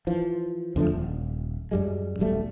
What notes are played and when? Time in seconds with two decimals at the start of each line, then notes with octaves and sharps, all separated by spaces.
0.07 E3 F3
0.76 E2 D3 F3 A3
0.90 D#1
1.71 F#2 G3 G#3
2.19 D#1 B1 G3 A3